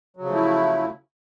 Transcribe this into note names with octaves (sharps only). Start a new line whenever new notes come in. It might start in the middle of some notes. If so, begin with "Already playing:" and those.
C#3 F3 F#3 A3 E4